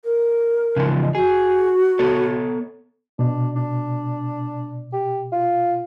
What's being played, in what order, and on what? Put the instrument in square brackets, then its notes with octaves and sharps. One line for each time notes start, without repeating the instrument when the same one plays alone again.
[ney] A#4
[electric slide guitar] C#3 E3 F3
[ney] D#5
[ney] F#4 [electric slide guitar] G#4
[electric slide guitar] B3 A4 C#5
[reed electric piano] B2 [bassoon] D4
[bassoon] D4
G4
F4